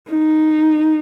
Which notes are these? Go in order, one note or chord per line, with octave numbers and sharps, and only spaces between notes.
D#4